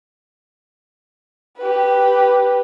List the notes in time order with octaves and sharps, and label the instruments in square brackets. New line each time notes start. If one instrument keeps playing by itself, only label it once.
[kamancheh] G4 B4